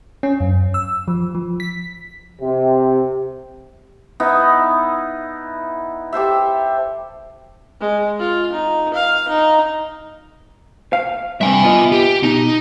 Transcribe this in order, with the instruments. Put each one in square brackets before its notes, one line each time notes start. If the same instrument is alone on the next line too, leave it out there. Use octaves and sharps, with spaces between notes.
[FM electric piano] C#4
F#2
E6
F3
F3
B6
[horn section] C3
[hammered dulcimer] B3 D#4 E4
G4 A4 C5 E5
[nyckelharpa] G#3
F4
D#4
F5
D#4
[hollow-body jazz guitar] F5
[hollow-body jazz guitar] G2 C3 [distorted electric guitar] E5 G#5
[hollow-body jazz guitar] B3 F4 D#5
[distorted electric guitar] G4
[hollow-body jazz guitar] B2 [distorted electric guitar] D#4